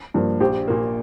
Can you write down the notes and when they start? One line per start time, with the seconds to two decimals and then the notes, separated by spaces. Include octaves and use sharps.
0.14 G2 F3 A#3
0.40 A#1 G4 C5
0.68 A#2 A#3